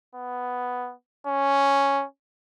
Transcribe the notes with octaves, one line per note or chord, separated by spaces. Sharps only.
B3
C#4